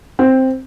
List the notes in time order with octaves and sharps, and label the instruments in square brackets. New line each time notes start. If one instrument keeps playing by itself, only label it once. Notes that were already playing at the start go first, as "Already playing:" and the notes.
[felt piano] C4